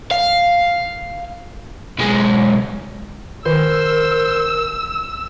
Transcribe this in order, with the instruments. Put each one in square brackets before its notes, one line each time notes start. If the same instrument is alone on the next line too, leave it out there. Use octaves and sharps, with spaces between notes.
[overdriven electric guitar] F5
B1 G#3
[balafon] D#3 [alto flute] A#4 [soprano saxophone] C5 [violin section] E6